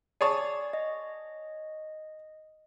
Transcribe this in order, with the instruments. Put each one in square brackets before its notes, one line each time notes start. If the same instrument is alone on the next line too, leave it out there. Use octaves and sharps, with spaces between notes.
[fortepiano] G#4 C#5 A5 [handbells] D5
[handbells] D#5